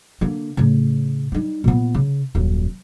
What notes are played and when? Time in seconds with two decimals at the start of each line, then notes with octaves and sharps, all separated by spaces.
0.21 D3 A#3
0.57 A2 C#3
1.32 G3 D#4
1.64 A#2 B3
1.94 C#3
2.35 D#1 F#2